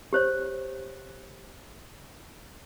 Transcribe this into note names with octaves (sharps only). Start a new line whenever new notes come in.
G4 C5 C#5